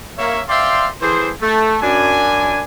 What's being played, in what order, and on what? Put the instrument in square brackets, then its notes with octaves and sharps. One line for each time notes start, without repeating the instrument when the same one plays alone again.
[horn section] A#3 C#5 E5
C5 D5 E5 F5 G5 C6
A2 E3 G#4 C5
A3
F#2 D4 G#5